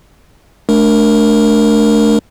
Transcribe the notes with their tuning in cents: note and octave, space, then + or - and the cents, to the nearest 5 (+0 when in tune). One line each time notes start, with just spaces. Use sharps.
A3 -20 D4 +0 A#4 +0